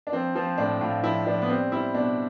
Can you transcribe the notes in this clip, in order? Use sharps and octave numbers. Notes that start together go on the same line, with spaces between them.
D4
F3 C4
F3 C4
A2 D4
A2 F4
F3 E4
F3 D4
B3
G3 C4
G3 E4
B2 D4